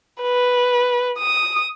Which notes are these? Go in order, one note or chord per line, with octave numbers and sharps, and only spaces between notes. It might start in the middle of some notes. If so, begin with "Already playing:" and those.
B4
D#6